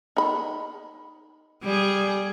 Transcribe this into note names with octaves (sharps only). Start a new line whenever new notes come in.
D#4 B5
G3 G#4